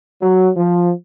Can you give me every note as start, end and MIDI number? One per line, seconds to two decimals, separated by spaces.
0.21 0.50 54
0.56 0.91 53